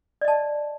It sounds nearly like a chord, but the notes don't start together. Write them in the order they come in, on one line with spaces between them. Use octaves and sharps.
D5 D#5 A5